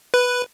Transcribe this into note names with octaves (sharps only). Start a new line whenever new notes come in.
B4